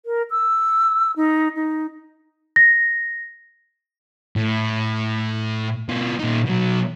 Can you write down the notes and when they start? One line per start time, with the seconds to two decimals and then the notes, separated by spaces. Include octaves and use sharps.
0.06 A#4
0.31 E6
1.16 D#4
1.56 D#4
2.56 A#6
4.36 A2
5.89 B2 F4
6.20 A#2 D#4
6.47 B2 F#3